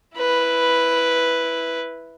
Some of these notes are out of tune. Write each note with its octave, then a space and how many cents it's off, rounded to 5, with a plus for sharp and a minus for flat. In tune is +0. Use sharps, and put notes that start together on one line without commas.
E4 +0 B4 +0